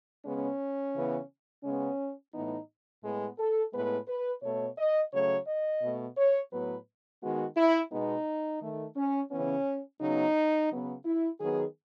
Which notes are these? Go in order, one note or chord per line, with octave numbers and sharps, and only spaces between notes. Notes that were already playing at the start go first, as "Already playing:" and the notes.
C#3 G#3 B3 C#4
C#3 E3 B3
C#3 G#3 B3 C#4
A2 E3 B3 D#4
A2 G#3 B3
A4
A2 G#3 B3 B4
B4
B2 A3 C#5
D#5
C#3 F#3 A3 C#5
D#5
B2 A3
C#5
A2 F#3 B3 B4
D#3 G#3 B3 F#4
E4
B2 G#3 B3 D#4
D#3 A3
C#4
C#3 E3 B3 C#4
C#3 F#3 B3 D#4
C#3 F#3 B3
E4
D#3 F#3 B3 G#4